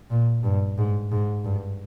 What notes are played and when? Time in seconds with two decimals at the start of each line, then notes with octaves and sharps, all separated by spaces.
0.10 A#2
0.43 G2
0.78 G#2
1.12 G#2
1.45 G2